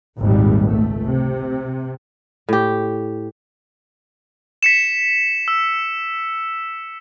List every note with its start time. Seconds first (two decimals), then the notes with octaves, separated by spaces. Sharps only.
0.18 G#1 D#2 A#2 G3
0.68 C#2 A3
1.07 C3
2.48 A2 G4
4.63 B6 C#7 E7
5.48 E6